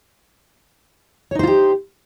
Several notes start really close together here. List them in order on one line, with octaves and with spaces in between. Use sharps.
C#5 D#4 C5 F4 G4